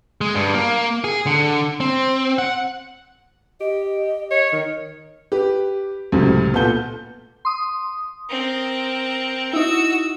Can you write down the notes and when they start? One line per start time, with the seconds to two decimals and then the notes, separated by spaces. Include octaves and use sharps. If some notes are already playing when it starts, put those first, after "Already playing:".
0.21 G#3
0.35 G2
0.54 A#3
1.04 G#4
1.27 D3
1.80 C4
2.39 F#5
3.61 G4 D#5
4.31 C#5 D#5
4.52 D#3
5.32 G4 B4
6.12 C#2 F#2 A2 C3
6.53 A#2 B3 F4 A4 G6 G7
7.45 C6 D#6
8.30 C4 A#4
9.53 D#4 E4 F#4 E6